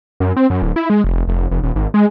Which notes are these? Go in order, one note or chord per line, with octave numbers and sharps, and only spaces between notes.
F#2
C4
F#2
D1
E4
G#3
F1
F1
F1
D#1
G#1
G#3